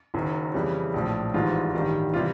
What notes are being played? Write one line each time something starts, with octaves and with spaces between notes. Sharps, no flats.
F#1 F#2 D#3
F2 C#3 E3 G3
A#1 A2 F3
G#1 G#2 E3 G3 F4
A1 G2 D#3 G3
C3 E3 G3 F4